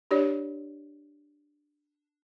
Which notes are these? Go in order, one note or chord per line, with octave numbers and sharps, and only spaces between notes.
D4 G4 C#5 D5